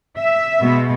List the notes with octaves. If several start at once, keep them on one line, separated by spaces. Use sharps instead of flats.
E5
B2 G#3 B3